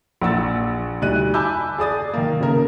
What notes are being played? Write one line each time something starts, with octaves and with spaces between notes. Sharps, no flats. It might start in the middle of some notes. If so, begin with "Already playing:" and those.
A#1 F#5 E6 A6
D2 G3 D#4 F#6 D#7
G#5 A5 B5 D6 E6 G6
G#4 D5 D#6 A6
D#3 A#3
C#3 A#4